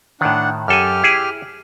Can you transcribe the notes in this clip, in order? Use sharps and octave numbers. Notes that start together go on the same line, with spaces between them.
A2 D#3 D4 F#5
F#2 G4 A4 G#5 F6
E4 G#4